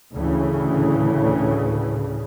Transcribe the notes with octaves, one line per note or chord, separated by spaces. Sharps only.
D2 A2 C#3 E3